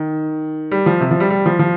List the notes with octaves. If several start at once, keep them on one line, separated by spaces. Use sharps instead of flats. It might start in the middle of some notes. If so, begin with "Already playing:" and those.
Already playing: D#3
G3
F3
C3
F3
G3
G3
F3
F3